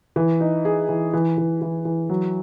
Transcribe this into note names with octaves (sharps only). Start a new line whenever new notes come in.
E3
D#4
G#4
E3
E3
E3
E3
E3
F#3